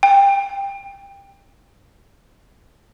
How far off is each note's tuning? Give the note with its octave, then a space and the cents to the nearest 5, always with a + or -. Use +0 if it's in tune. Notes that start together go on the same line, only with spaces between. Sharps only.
G5 +20